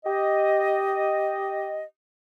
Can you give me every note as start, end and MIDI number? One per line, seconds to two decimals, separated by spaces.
0.05 1.84 67
0.05 1.84 75